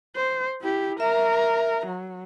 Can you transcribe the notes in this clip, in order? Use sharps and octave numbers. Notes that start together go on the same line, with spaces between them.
C5
E4 G4
A#4 E5 A#5
F#3